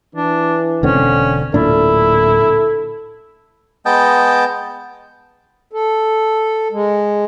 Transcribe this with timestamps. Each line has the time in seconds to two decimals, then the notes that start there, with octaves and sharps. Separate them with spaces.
0.15 E3 D4
0.83 E1 D3 C4 C#4
1.54 D1 A#2 D4 E4 A4
3.86 G#3 B3 D#5 G5 A5
5.72 A4
6.72 G#3